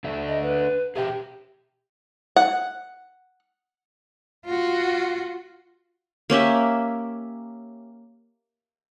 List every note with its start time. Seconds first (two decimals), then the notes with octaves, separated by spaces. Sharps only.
0.04 D4 A4 E5
0.28 D#5
0.43 B4
0.96 G4 G#4 E5 G5
2.36 F#5
4.46 F4 F#4
6.30 A#3 C#4 G4 E5